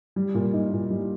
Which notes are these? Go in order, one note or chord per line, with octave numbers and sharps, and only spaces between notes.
G3
A#2
D#4
A#2
G3